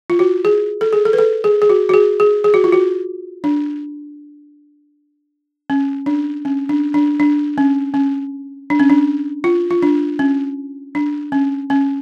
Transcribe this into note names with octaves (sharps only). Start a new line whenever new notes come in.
F4
F#4
G#4
A4
G#4
A4
B4
A4
G#4
G#4
F#4
F#4
G#4
G#4
G#4
F#4
F4
F#4
D4
C#4
D4
C#4
D4
D4
D4
C#4
C#4
D4
C#4
D4
F4
F4
D4
C#4
D4
C#4
C#4